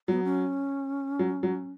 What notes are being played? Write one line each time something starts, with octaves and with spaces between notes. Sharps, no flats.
F#3 B3
C#4
F#3
F#3